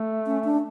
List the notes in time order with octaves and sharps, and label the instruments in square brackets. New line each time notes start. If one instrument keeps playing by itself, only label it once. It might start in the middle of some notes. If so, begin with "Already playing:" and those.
Already playing: [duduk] A3
[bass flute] C#4
D4